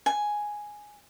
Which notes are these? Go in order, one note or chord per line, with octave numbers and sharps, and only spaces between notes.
G#5